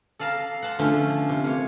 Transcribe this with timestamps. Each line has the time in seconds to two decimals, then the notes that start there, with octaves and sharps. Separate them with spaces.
0.19 A4 D5 F5 A5 A#5
0.62 F#5 A5 C6
0.79 D3 F3 A3 C#4
1.29 C3
1.44 A#3 C#5